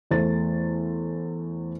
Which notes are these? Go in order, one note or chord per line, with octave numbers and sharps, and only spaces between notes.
E2 A3 C5 A6